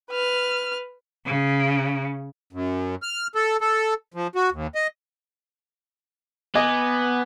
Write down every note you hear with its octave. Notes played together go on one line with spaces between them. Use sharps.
B4 F6
C#3
F#2
F6
A4
A4
F3
F#4
D#2
D#5
B3 D#5 G#5 D6 G#6